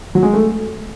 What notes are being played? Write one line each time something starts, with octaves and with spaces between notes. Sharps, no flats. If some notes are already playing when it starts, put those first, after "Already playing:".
F#3
G#3
A3